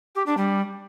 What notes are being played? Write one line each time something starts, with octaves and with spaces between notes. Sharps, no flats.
G4
D4
G3